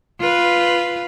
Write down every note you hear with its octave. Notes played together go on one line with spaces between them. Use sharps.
F4 B4